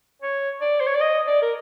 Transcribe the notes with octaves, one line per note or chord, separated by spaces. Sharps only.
C#5
D5
C5
C#5
D5
D#5
D5
A#4